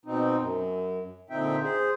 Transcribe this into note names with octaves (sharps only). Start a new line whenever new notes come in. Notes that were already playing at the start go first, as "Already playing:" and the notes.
B2 C4 D#4
F#2
A#2 D3 C4 D#4 E5 G5
G#4 C5